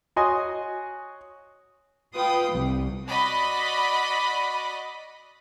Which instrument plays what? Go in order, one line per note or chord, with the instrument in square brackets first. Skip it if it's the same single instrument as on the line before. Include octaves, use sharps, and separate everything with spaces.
[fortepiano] F#4 C#5 D#5 G#5 C6 D#6
[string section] F4 B4 G5 D#6
C2
[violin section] F#4 D5 D#5 B5